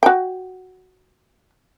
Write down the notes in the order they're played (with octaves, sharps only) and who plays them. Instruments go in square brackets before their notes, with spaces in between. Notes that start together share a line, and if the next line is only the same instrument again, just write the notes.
[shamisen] F#4 G5